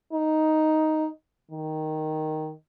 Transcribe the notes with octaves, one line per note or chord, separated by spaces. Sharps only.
D#4
D#3